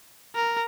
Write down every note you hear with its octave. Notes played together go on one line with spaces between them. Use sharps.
A#4